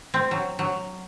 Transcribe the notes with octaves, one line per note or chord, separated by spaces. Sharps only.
C4
F#3
F#3